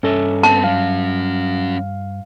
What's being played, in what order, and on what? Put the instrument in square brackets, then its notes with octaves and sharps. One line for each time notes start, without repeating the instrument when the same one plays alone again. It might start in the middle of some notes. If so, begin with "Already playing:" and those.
[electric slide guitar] G2 D#5 E5 [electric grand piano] C#4 A4
[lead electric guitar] B3 C4 [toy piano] A5
[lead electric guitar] F#3 C#4 [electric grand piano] F5